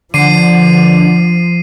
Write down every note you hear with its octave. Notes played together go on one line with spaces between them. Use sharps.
D3 F3 C7 D#7